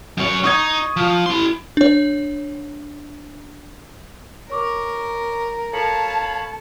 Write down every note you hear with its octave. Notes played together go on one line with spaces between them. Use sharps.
F#2 C#5
D#4 C#6 D#6 G#6
F3
E4 C6
D4 C#5
A#4 C#5 C#6 D6
A4 C#5 F5 A5 B5 C#7